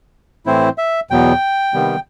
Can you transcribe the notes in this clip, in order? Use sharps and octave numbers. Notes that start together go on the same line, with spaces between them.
A2 E3 A3 C4 E4 C5
E5
E2 B2 F#3 B3 G5
C3 D#3 G3 B3